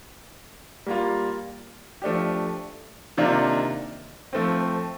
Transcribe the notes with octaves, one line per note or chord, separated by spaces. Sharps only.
G3 A#3 F4
F3 A3 D4 G4
C3 D#3 A#3 D4 F4
F3 A3 C4